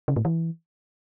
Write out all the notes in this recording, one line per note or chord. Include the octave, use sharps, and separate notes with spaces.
C#3
A2
E3